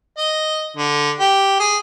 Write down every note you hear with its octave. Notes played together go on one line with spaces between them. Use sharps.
D#5
D3
G4
G#4